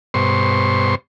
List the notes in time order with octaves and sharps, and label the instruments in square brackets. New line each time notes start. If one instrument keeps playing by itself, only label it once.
[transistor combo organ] G2 B2 C5 C6 C#6